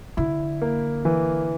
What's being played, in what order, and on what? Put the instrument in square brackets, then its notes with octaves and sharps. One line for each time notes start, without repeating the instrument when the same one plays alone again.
[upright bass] D3 [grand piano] E4
[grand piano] A#3
E3